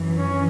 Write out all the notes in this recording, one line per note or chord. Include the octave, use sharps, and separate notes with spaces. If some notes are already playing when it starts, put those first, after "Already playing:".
Already playing: F#2 E3
C#4